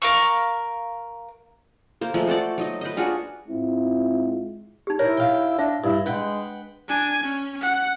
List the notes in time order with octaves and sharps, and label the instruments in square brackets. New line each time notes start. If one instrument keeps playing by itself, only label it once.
[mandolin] A#4 F5 C#6
[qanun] A#3 C5
F3 G#3 A3
F#4 A4 C5 D5
F#3 D#4 D#5
B4 C5 D#5
D4 F4 F#4 G#4
[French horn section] G#2 G#3 C4 E4 F4
[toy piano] D#4 G4
[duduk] E4 [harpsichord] A#4 [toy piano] C#5
[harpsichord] F5 G5
[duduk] D4 [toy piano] E5
[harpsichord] G2 [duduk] E4
[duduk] G#3 [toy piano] D4 [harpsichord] B4 F#5 G5
[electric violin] D4 G#5
C#4
F#5